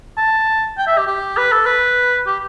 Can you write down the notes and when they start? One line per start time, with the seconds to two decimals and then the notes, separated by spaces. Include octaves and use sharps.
0.18 A5
0.78 G5
0.87 E5
0.97 G4
1.07 G4
1.38 B4
1.52 A4
1.66 B4
2.27 G4